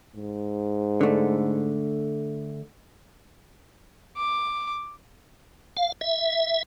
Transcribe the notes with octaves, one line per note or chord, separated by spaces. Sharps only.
G#2
D3 A3
D6
F5
E5